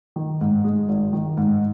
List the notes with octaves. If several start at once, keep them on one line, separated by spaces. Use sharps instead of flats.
D#3
G#2
G#3
G#1
D#3
G#2